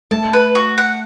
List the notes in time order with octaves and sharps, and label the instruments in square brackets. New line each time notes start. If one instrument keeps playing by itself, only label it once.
[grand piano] A3 [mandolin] A5
[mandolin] B4
F#4
F#5